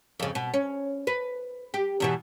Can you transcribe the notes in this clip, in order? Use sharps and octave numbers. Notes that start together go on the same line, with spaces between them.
F2 C#3
B2
C#4
B4
G4
E2 B2 E3